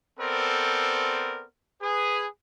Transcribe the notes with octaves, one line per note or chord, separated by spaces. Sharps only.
B3 C4 A4 A#4 C5 D5
G#4 B4